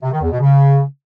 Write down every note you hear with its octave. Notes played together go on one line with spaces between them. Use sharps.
C3
D#3
E2
B2
C#3